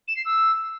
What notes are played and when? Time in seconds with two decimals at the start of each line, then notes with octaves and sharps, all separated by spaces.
0.08 E7
0.16 C7
0.25 E6